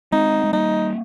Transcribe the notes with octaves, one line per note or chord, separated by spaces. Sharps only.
G#3 C4 D#4
G#3
G3 A#3 D#4